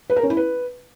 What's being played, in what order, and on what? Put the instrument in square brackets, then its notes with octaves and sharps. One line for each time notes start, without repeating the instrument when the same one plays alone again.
[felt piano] B4
A#4
C#4
E4
B4